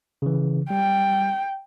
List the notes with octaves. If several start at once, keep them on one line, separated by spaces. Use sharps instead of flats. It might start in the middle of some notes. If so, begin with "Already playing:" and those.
C#3 E3
G3 G5